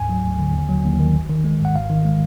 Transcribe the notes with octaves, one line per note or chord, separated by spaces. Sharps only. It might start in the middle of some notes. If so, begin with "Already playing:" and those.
Already playing: D2 G#2 G#5
F#3
D2
D3
D#2
F#3
D#2
D#3
G#1
D#3
G#3
G#2 F#5
G#1 F5
D#3
G#3